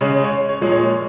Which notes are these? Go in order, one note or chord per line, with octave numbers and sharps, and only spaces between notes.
C#3 G#3 C#5
C#5
C#5
A#2 F3 G#3
C#5